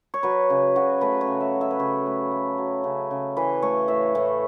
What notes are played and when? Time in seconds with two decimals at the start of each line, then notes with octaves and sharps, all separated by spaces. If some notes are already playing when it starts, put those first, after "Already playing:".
0.14 C#5
0.23 F#3 B4
0.50 C#3
0.76 C#3 F#4
1.01 A3 B4
1.21 C#5
1.27 C#3
1.40 E5
1.54 F#3
1.61 E5
1.71 B4
1.79 C#3 C#5
2.06 A3
2.32 A3
2.58 F#3
2.84 C#3
3.11 C#3
3.37 E3 B4
3.62 A3 C#5
3.88 A2 E5
4.15 A2